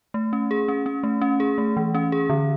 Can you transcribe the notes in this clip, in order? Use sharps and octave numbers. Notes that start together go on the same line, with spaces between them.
A3
C#4
G#4
C#4
C#4
A3
C#4
G#4
A3
E3
C#4
G#4
D3